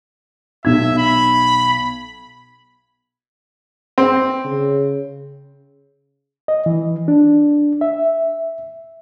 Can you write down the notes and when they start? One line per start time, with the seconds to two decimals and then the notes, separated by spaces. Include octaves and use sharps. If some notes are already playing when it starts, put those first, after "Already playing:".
0.65 B1 E5 G#6
0.98 B5
3.98 C4
4.45 C#3
6.48 D#5
6.66 E3
7.08 D4
7.81 E5